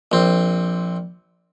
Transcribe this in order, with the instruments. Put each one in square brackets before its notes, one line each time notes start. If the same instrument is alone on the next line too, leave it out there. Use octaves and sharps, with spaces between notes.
[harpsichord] A#1 C4